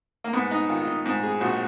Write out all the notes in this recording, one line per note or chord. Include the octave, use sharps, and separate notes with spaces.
A#3
G#2 B3
D#4
D#3 F4
F4
D#4
G#2
G#4
A#1 F#4